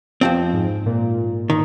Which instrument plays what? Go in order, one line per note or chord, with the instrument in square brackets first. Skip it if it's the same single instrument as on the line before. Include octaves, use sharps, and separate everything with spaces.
[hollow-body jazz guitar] F2 F3 C4
[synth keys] G#2
A#2
[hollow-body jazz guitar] D#3